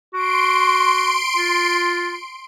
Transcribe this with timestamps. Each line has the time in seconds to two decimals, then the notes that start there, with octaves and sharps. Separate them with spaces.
0.14 F#4 C6 D7
1.37 F4